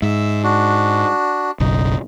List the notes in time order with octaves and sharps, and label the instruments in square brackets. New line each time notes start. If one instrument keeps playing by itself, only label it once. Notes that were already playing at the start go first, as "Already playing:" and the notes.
[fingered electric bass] G#2 [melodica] E5 E6
[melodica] D4 F#4
[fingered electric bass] F#1 B1 [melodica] D#4